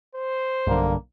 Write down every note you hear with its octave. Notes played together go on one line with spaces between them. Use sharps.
C5
B1 G2 D3 A#3